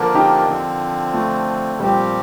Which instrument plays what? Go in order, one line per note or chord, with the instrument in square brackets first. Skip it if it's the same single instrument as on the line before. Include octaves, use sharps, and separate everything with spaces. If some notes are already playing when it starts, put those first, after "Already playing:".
Already playing: [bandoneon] D3 F3 A#3 D4 [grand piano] A#4
[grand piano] D#4 G4
[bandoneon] D3 F3 C4
[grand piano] A3
[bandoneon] A#2 F3 C4 G4 [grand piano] G3